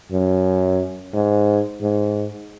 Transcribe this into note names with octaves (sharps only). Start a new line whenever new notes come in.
F#2
G#2
G#2